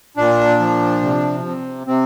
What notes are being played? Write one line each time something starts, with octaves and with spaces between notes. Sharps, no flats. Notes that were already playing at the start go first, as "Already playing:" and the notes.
A#2 D4
F3
C3
C3
C3 C4